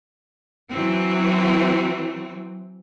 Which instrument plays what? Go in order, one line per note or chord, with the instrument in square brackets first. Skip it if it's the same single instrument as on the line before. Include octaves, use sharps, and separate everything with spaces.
[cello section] E3 F#3 C4